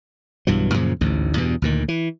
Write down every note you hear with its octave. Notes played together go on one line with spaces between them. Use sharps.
B1 G2 E3 F#3
F#2 A#2 C#3 F3
A1 D2 G#2
E2 G2 B2
D2 A#2 D#3
E3